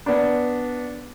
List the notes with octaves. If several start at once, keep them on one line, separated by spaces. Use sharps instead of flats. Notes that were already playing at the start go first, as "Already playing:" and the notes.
B3 D4